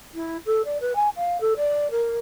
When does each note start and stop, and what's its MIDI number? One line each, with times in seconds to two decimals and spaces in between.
0.14 0.36 64
0.45 0.62 69
0.64 0.77 74
0.80 0.95 71
0.95 1.08 80
1.15 1.37 77
1.40 1.53 69
1.56 1.87 74
1.90 2.19 70